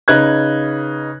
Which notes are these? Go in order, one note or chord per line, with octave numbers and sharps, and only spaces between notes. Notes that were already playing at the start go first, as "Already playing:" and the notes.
C#3 D#4 B4 F#6 G#6